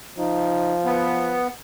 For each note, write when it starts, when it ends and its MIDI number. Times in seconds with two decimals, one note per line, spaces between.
0.18 1.43 53
0.18 0.75 63
0.85 1.48 59
0.85 1.39 71